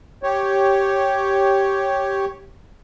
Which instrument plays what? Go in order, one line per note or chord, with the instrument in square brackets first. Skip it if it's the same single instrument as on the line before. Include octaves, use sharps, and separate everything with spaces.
[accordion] G4 C#5